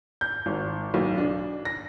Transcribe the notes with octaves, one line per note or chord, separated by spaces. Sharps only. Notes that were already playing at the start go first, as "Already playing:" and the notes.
G6
G#1
B1
D4
A#6